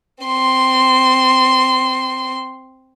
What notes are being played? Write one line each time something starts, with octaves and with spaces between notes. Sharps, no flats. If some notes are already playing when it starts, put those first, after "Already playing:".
C4 C6